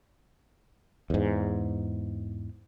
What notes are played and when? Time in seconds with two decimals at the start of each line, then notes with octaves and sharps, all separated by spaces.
1.10 E2 G#2